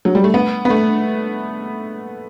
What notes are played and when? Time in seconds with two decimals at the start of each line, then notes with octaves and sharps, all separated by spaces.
0.05 F#3
0.15 G3
0.24 A3
0.34 B3
0.65 B3
0.70 A3